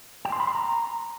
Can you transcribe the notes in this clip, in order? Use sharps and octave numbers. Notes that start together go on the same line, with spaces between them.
G5
C6
B5
C6
A#5